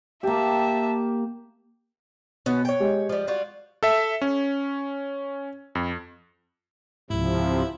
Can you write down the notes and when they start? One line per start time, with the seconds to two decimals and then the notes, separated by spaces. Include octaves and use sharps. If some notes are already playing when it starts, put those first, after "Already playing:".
0.23 A#3 G4 E5 A5
2.46 B2 B3 C#4 F#4
2.65 C#5 G5
2.80 G#3 G4
3.09 F3 G3
3.27 G3 F4 F#4
3.83 A4 E5
4.22 C#4
5.75 F2
7.10 C#2 G#2 C3 F3 E4